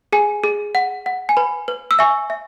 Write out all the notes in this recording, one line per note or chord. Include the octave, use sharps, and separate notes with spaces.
G#4 G#5
G#4
F#5
F#5
G#5
B4 B5
B4
E6
E5 G#5 C#6
E5